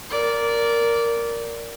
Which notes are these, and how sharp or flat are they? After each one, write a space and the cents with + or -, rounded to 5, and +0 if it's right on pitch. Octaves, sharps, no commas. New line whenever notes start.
A#4 +0 D5 -15